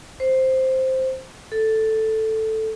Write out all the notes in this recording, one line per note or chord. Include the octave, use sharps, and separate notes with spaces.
C5
A4